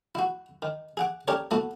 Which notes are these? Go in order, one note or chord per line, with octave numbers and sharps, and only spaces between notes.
E4 F#4
D#3
G#4 F#5 D6
C#4 G4 A4 A#4 C#5 D5
A3 B3 E4 F#4 A4